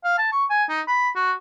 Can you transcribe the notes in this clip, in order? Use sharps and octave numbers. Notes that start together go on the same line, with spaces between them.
F5
A5
C#6
G#5
D#4
B5
F#4